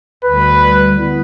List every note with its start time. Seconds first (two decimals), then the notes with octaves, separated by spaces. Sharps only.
0.24 D2 D3 G3 B4
0.98 D3 B3 E4